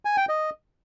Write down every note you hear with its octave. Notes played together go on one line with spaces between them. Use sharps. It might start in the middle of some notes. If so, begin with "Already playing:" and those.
G#5
G5
D#5